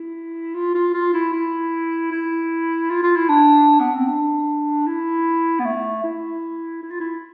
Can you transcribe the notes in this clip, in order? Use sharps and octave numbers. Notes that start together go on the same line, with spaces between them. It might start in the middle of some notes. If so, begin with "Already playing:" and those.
Already playing: E4
F4
F4
F4
E4
E4
E4
F4
F4
E4
D4
B3
C4
D4
E4
B3
A3
E4
E4
F4
E4